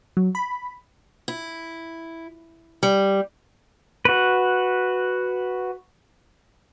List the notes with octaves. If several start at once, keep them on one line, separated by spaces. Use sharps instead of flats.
F#3
B5
E4
G3
F#4 B4